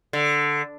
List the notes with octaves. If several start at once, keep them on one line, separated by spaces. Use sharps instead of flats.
D3